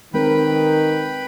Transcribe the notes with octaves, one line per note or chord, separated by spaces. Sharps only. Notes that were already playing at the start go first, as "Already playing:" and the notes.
D#3 G#3 C4 A#4 B4 G5 B5